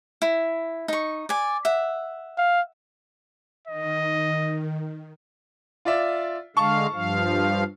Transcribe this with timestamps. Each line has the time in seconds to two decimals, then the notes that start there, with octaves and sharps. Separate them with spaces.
0.22 E4
0.88 D#4 C#6
1.29 D5 G#5
1.65 E5 F#5
2.38 F5
3.68 D#3 D#5
5.85 F4 D5 E5
6.57 D3 G#3 F5 A5 C#6
6.93 G2 F3 F5